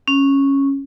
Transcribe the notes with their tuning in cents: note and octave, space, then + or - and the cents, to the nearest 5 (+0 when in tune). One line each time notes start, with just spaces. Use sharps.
C#4 -10